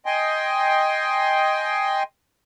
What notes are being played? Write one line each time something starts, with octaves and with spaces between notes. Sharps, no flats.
D#5 G5 G#5 C6